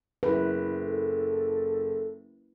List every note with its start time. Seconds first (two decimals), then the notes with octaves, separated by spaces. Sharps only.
0.23 F#1 E4 B4
0.83 A4